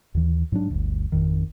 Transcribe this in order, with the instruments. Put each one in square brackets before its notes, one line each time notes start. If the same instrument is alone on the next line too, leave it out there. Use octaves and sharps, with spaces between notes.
[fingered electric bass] D#2 E3
G#2 F#3 D4
G1 D2
G#1 F2 D#3